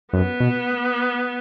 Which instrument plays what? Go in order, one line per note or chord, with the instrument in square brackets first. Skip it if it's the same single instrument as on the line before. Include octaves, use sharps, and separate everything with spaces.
[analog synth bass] F#2 [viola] B3
[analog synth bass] B2